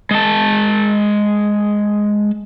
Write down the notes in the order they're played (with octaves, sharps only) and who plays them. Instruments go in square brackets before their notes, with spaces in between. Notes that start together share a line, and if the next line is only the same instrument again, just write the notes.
[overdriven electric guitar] G#3 A5